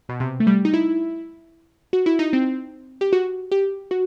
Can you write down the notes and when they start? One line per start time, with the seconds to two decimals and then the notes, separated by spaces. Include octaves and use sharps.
0.09 B2
0.20 C3
0.40 A3
0.47 G3
0.65 D#4
0.74 E4
1.93 F#4
2.06 E4
2.19 D#4
2.33 C4
3.01 G4
3.13 F#4
3.52 G4
3.91 F#4